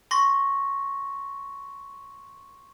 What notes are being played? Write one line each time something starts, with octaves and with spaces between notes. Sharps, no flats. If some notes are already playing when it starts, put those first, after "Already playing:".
C6 C#6 A#6